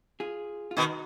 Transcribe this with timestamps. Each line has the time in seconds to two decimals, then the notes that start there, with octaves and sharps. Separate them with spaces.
0.20 F4 G#4
0.71 F4
0.77 B2 D#3 D#4 F#4